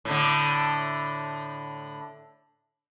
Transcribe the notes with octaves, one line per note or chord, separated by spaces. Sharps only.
A2 D3